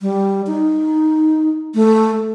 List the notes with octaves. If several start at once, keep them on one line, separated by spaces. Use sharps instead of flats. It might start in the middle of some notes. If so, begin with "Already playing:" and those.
G3
D#4
A3